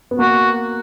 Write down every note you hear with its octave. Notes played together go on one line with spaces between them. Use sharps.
B3
A#3 F#4